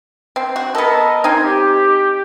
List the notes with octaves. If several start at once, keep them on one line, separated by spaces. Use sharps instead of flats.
C4
F#4
B3 A4 A#4 D#5
C4 D#4 G#5
G4